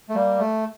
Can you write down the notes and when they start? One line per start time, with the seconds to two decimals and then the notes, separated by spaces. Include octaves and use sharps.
0.09 A3
0.14 G3 A#3
0.39 A3